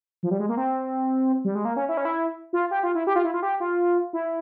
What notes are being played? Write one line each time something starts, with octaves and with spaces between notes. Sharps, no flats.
F3
G3
G#3
A#3
C4
G3
G#3
A#3
C#4
E4
C#4
E4
F4
G4
F4
E4
G4
F4
E4
F4
G4
F4
E4